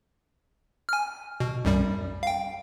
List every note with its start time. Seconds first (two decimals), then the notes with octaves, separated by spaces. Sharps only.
0.89 G#5 F6
1.40 B2
1.65 B1 F#2 G3
2.23 F5 G5